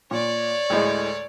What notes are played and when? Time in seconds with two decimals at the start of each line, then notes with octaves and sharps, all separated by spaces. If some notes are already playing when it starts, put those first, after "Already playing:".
0.11 A#2 C#5 D5
0.70 D2 A2 G#3